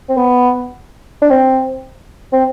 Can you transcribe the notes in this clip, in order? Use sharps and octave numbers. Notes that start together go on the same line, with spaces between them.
C4
B3
D4
C4
C4